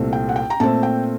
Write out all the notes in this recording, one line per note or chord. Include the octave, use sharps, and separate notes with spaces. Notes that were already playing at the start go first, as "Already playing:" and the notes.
Already playing: C2 A#2 A3 C4
G5
F#5
G5
A#5
A#2 A3 C4 A5
G5